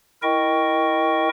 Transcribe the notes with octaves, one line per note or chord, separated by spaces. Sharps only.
E4 A#4 D#5 G5 C#6